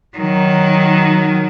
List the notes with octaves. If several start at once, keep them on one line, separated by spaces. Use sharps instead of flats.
D#3 F#3